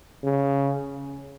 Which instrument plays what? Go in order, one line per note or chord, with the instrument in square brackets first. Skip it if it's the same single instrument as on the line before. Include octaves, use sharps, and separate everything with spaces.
[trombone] C#3